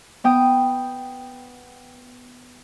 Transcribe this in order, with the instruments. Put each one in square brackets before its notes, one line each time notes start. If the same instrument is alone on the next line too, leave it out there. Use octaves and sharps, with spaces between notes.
[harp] B3 G5 D#6